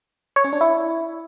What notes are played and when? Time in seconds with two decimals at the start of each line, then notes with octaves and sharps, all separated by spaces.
0.36 C#5
0.44 C#4
0.53 D4
0.61 E4